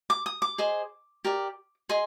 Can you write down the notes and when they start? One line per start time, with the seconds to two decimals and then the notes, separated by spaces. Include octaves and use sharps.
0.10 D6
0.26 D#6
0.42 D6
0.58 G#4 C5 D#5
1.25 G4 A#4 D5
1.89 G#4 D#5 C6